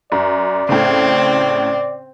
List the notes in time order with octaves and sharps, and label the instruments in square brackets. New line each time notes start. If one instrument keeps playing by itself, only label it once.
[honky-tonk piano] F#2 [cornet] D5
[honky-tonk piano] A2 C#3 [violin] C4